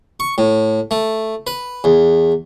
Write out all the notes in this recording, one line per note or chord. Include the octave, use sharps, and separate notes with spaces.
C#6
A2
A3
B4
E2